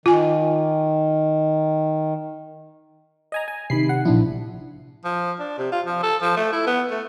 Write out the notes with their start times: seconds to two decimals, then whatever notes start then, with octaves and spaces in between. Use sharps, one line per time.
0.06 D#3 F4 G#5
3.32 D#5 G#5 A#5
3.48 G#5
3.70 C3 D#3 B5 C7
3.89 F#5
4.05 A#1 F3 D4 E4
5.05 F3
5.39 D4
5.58 C3
5.72 F4
5.86 F3
6.03 A4
6.22 F3
6.37 A3
6.53 E4
6.67 B3
6.91 A3